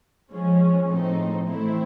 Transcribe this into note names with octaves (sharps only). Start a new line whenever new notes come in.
F3 G#3 C#4
A2 F3 A3 C4 D#4
E3 A3 C4 E4